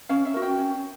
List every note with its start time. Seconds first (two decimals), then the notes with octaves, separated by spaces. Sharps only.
0.09 C#4 F5
0.25 E5
0.34 F#4 A#4
0.42 G5
0.58 C#4